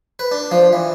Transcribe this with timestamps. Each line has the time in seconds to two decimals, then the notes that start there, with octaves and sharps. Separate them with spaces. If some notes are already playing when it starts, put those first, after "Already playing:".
0.19 B4
0.32 D4
0.51 F3
0.73 E3